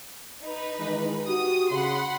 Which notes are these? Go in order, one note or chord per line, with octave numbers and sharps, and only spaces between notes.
D#4 B4
D#3 E3 G#3
F#4 G4 D#6
C#3 F#5 B5 C6